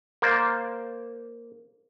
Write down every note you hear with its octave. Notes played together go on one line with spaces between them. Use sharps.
A#3 C5 D5